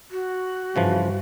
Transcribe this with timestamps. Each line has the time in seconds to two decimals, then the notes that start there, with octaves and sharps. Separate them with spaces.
0.11 F#4
0.76 G2 C#3 E3 F3